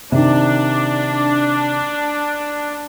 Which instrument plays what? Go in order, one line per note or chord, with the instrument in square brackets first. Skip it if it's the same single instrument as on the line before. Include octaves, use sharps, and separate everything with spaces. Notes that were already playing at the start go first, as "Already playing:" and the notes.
[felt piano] C3 D#3 [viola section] D4